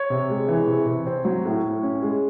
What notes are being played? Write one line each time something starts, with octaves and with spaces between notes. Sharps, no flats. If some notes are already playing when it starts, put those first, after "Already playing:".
Already playing: C#5
C3
G#3
E3
C3
C3
C4
F#3
A2
A2
C#4
G#3